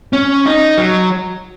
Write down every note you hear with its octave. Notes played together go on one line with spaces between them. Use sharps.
C#4
D#4
F#3